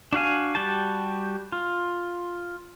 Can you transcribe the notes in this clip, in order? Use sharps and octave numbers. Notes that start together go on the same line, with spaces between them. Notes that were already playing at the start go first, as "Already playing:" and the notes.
D4 F#4 F5 G#5
G3 F#4 G4 A5
F4